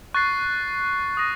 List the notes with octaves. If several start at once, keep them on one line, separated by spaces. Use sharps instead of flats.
C#6 F#6 A6 C7
D#6 A#6 D#7